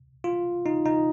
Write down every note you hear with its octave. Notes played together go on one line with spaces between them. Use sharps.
F4
D#4
D#4